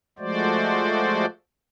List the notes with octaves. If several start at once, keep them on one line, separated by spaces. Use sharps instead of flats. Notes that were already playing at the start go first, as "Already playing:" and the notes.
F3 G#3 A3 F#4 C5 D5